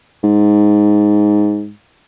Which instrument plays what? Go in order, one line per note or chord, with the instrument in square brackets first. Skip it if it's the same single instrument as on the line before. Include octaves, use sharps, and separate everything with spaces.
[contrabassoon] G#2